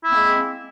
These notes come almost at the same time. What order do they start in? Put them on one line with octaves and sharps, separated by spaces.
E4 A#3 C4 G#3